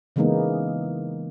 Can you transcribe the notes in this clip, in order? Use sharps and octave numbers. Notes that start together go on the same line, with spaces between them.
C#3 E3 G#3 A#3 B3 D#4